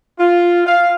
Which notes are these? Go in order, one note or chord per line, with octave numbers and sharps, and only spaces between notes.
F4
F5